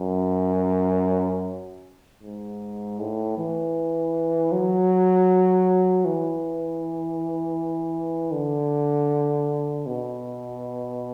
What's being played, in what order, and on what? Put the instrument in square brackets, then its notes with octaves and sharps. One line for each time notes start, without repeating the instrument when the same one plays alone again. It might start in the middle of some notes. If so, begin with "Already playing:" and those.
Already playing: [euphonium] F#2
G#2
A2
E3
F#3
E3
D3
B2